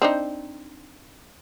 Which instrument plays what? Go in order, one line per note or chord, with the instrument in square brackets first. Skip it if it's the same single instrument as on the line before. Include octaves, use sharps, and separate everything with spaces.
[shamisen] C4 D4 D#4